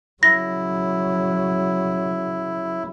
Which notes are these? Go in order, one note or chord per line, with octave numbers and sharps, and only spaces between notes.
C#3 F#3 E4 A#6